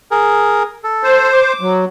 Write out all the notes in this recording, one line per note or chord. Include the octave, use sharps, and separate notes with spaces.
G#4 A#4
A4
C5
D6
F#3